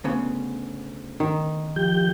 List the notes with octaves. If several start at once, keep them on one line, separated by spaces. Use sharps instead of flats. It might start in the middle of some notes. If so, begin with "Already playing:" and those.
D2 C#3 B3
D#3
F3 G4 G6